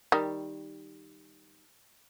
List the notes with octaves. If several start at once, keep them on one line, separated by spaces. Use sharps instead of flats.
D#3 G3